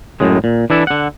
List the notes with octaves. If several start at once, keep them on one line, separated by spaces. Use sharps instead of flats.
F#2 A2 G#3
A#2
E3 D4 E4 A4
D3 F#5